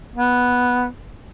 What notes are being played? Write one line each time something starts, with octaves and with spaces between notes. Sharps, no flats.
B3